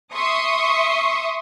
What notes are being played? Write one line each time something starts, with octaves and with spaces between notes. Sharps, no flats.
E5 C6 C#6 D#6